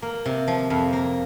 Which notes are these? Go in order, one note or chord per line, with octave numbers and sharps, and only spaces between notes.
A#3
C3
F3
F2
A#3